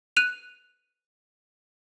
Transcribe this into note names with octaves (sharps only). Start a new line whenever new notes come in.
F#6 D#7 F7